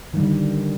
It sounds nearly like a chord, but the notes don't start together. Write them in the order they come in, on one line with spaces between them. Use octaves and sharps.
D#3 G3 D3